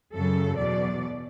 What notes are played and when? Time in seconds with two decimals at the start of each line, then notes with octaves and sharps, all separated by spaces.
0.14 F#2 C#3 F#3 A4
0.57 E2 B2 F#3 D5